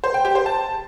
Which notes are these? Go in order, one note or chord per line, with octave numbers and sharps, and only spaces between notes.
C5
G5
G4
C5
A5